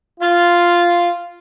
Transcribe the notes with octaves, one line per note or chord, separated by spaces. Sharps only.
F4